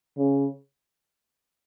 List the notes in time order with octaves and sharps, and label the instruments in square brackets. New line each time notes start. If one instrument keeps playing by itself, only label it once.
[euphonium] C#3